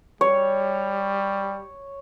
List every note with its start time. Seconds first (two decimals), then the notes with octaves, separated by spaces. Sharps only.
0.21 G3 C#5